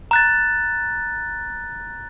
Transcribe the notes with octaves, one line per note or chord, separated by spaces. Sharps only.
A#5 F#6 A6